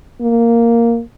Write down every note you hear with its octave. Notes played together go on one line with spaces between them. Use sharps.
A#3